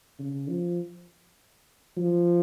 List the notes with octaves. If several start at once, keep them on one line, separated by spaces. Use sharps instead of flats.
C#3
F3
F3